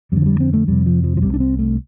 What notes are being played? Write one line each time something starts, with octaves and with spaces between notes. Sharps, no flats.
F2 D3 G3
F3
G3
C4
A3
F2 C3 G3
F3
F3
F3
C2 C3 G3
D4
C4
A3